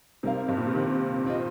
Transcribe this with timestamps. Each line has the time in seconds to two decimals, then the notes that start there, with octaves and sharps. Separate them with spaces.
0.23 C3 G3 D#4 A#4 F5
0.48 G2
0.57 A#2
0.67 C3
0.75 D#3
1.26 C4 F4 D#5